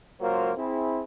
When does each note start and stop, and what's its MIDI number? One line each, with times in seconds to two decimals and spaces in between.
0.20 0.51 37
0.20 0.51 54
0.20 0.51 58
0.20 0.51 65
0.20 0.51 70
0.20 0.51 72
0.56 1.02 60
0.56 1.02 64
0.56 1.02 68